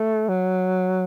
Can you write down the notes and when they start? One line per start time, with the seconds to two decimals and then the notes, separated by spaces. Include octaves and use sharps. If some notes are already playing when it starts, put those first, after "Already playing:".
Already playing: A3
0.29 F#3